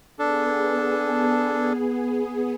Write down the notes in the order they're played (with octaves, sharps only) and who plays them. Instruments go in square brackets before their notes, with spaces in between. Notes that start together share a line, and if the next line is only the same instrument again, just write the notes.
[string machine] B3 G#4 [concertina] D4 A4